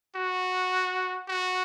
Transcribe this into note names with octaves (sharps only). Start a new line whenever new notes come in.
F#4
F#4